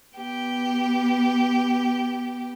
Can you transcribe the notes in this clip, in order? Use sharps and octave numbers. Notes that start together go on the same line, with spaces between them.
B3 G4